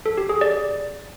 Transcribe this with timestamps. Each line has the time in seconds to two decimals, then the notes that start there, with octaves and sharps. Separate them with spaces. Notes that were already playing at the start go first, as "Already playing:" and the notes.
0.06 A4
0.18 G4
0.29 G#4
0.41 D5